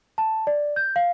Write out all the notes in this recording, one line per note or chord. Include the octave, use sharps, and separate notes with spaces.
A5
D5
G6
F5